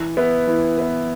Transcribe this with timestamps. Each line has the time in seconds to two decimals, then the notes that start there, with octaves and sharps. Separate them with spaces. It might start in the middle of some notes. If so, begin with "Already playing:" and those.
Already playing: E3
0.17 B3 E4 B4
0.47 E3
0.78 B3 E4 B4